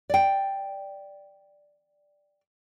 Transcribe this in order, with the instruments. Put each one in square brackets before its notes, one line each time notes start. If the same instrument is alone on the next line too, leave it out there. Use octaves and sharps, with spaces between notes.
[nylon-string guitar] D5 G5